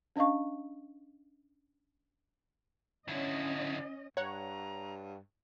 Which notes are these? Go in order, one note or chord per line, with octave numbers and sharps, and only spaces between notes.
C#4 D4 D#5 F5 C#6
D3 C#4 E4 D#5
G2 C#5 F#5 A#5